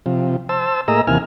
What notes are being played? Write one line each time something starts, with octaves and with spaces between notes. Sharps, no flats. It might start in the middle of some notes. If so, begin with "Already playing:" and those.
C3 F3
C5 A5 E6
A2 A#3 G#4 D#5 A#5 E6
D#2 C3 E3 A#3 G#5 F6